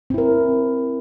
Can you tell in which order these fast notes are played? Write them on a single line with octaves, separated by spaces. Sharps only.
C4 E4 A#4